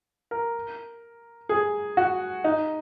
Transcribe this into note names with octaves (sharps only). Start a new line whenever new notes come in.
A#4
G#4
F#4
D#4